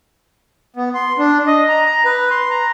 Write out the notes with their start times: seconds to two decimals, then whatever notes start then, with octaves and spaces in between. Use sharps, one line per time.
0.76 B3
0.94 C6
1.18 D4
1.47 D#5
1.68 A#5
1.85 A#5
2.05 B4
2.31 C6
2.50 A#5